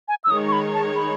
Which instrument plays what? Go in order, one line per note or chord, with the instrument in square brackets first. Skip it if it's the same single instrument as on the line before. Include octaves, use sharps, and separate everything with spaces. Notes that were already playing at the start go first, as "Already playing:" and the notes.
[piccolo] G#5
E6
[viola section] D#3 G#3 D#4 G#4 C#5 [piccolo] D#6
[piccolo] C#6
B5
A5
B5